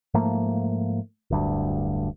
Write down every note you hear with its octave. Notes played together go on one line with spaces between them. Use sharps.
G#2 F3 A3 A#3
D1 D2 G2